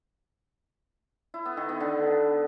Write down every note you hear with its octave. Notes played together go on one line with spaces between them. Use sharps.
E4
B3
D#3
B3
D3